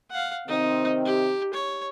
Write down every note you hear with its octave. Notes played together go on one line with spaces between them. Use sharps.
F5 F#5
C3 D#3 C4 D#4
G4
C#5